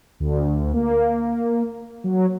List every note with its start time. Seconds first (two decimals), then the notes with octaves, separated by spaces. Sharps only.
0.20 D2
0.73 A#3
2.04 F#3